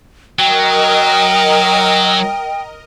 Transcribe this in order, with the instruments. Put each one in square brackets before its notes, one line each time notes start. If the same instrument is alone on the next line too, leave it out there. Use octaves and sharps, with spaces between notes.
[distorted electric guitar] F#3 [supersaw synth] A#4 D#5 [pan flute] G5